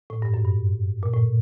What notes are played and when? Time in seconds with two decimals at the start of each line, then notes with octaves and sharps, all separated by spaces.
0.10 A2
0.22 G2
0.34 F#2
0.45 G2
1.03 A#2
1.13 A2